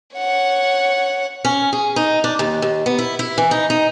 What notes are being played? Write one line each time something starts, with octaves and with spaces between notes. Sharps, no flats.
C#5 F#5
C#4
G#4
D#4
D4
D#2
D#2
B3
E4
E4
E3
D#4
D#4